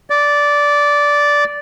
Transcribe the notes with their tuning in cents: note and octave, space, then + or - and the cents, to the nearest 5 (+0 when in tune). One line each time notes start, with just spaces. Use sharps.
D5 -10